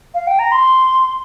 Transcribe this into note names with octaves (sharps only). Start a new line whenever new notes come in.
F5
G5
A#5
C6